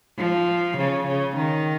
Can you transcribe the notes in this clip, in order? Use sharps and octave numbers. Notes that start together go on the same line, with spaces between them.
F3
C#3
C#3
D#3